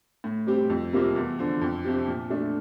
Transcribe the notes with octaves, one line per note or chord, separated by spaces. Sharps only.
A2
G3 C4 G4
F2
C3 G3 A#3 F4
E2
D3 F3
F2
C3 F3 C4 G4
A#2
A3 D4